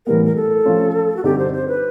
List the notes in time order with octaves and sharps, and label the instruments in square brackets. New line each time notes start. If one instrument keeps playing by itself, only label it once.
[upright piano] A2 E3 G3 B3 [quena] A#4
[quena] A#4
A4
[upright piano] F3 A3 C#4 F4
[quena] F#4
[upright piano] G2 D3 G3 C4 D#4 [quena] G4
[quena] C5
C5
B4